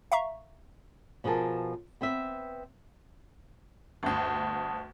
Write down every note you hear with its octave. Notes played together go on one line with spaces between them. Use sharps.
E5 F5 A#5 C#6
B2 F3 G#4 A#4 A5
B3 C4 B4 E5
G1 D2 A5 D#6